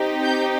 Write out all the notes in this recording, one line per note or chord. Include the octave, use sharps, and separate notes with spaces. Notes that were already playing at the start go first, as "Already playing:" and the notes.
Already playing: C4 D#4 G4
G6